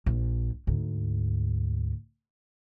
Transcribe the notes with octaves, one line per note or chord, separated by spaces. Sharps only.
A#1
D2 G#2